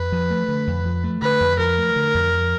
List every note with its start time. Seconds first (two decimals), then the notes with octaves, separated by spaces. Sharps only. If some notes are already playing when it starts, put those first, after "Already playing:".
Already playing: F2 B4
0.12 F3
0.30 A3
0.48 D3
0.67 F2
0.85 F3
1.04 A3
1.22 D3 B4
1.40 F2
1.59 F3 A#4
1.78 A3
1.96 D3
2.14 F2
2.32 F3